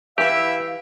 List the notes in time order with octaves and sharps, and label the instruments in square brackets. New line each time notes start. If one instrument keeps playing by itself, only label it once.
[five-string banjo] E3 B4 [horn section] E4 E5 [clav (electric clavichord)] G4 [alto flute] F5